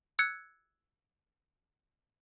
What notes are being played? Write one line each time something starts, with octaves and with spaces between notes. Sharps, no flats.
E6 F#6 G#6 C#7